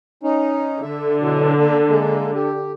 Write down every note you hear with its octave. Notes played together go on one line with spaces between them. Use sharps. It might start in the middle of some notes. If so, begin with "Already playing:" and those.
C#4 D#4
D3 E5
B2 E3 F#3
A#3 A4
G#3 A#3
G4